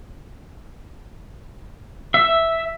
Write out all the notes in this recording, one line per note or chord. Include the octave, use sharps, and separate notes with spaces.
E5